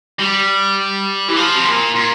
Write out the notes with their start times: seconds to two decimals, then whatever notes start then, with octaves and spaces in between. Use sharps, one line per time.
0.19 G3
1.28 E3
1.37 F3
1.55 C3
1.65 A#2
1.95 A#2